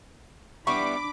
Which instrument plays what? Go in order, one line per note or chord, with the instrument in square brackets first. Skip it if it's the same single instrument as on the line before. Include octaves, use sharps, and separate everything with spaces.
[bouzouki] G3 B3 E4 [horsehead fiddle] D4 B5 [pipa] C#6 [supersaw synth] D6